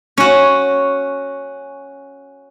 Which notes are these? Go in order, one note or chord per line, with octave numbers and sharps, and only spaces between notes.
C#4 F#4